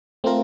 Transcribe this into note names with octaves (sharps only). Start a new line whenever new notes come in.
A3 C4 F4 A#4